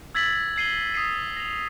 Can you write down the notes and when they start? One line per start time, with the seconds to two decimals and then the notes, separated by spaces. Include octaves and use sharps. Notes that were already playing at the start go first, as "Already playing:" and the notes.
0.15 E6 G#6 A6 B6 F#7
0.56 G#6 C7 D#7 G7
0.94 D#6 B6 C7 D#7
1.37 A#6 F7